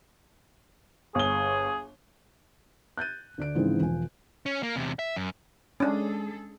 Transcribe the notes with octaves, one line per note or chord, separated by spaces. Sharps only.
G1 G#4 G7
F#6 G6 A6 D#7
D2 D5 D7
G#2 C#3 E3 F3 G#3 C4
E1 F3 G#5
C#4
A#3
E2 C3
E5
F#2
G#3 C#4 D4 G#4 A4